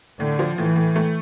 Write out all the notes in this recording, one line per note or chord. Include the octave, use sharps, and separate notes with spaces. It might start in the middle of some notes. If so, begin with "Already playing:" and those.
A2 D3
F3
A2 E3
A2
A3